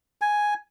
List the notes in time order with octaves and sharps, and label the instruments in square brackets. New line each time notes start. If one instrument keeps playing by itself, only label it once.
[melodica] G#5